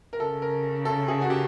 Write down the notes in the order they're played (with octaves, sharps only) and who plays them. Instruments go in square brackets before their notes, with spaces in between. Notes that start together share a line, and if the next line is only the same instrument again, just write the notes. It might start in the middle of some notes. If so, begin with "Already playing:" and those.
[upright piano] A#4
[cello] C#3 [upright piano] A4
[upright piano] A#4
A4
G#4
F#4
G4